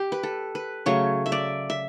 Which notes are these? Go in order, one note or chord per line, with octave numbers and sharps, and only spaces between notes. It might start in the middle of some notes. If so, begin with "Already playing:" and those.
Already playing: G4
B4
A4
B4
C#3 F#3 A3 C#5
E5
D5
E5